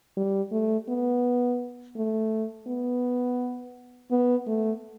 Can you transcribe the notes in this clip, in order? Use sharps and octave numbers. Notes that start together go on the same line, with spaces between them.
G3
A3
B3
A3
B3
B3
A3